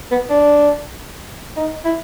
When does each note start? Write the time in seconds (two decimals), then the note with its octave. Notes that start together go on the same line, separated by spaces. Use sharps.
0.12 B3
0.30 D4
1.57 D#4
1.85 E4